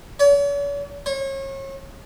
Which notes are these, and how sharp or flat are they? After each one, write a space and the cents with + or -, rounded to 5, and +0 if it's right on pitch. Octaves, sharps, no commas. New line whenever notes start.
C#5 +45
C#5 -35